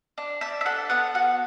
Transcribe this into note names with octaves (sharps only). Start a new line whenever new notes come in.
D4
D4 E5
E5
A4 F#5
B3 F#5
F#4 F#5